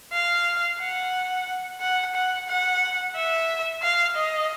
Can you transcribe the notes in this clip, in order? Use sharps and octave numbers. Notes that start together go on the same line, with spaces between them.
F5
F#5
F#5
F#5
F#5
E5
F5
D#5